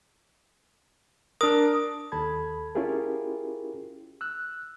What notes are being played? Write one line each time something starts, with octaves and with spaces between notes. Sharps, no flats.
D4 A#4 D#6
D#2 A4 A5 B5 G#6
C#4 E4 F4 G4 G#4 A#4
E6 F#6